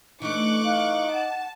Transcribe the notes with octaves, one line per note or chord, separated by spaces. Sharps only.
E3 A3 D4 D#4 C#6 D6 F#6
D#4 F5
F#5 A5